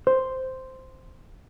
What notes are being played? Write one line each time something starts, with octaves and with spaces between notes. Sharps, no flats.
C5